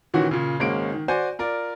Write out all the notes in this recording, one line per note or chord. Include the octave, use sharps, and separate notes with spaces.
A#2 D#3 E3 C#4 F#4
A#2 C#3
G#1 G#3 A#3 C#4 D7
D#3
F#4 C5 D5 G#5
F4 A#4 D5